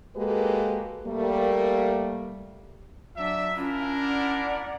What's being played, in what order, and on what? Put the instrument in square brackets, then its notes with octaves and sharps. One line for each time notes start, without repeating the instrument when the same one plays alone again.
[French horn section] G#3 A#3 F#4 G4 A4 B4
G3 A3 A#3
[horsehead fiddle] F#3 D4 [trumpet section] E5
[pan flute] C#4 [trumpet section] D4 E4 A#4 [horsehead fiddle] F4
[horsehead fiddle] D5 F#5